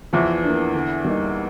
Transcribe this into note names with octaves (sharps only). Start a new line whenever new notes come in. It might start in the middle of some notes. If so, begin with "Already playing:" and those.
E2 E3 F3
A#3 D4
D3
G3 A#3 D#4